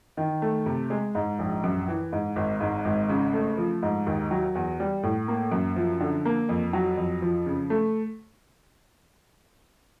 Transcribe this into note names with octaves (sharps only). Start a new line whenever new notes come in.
D#3
A3
C3
G#3
G#2
A#1
F#2
E3
G#2
G#1
G#2
G#1
C#3
A3
F3
G#2
D#2
F#3
E2
G3
A2
A#3
F#2
F3
D3
A#3
F2
F#3
F2
F3
C#3
A3